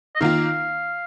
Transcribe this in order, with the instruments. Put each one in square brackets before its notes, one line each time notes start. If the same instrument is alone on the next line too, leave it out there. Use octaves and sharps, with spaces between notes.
[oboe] D#5
[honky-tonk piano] D#3 A#3 F4 [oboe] F5